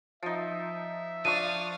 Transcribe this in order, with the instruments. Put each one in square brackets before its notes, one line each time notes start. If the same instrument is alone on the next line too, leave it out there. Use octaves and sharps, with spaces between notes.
[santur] F3 D#4 [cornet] E5
[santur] F3 D4 C#6 [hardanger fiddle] F5 D#6 [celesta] D#7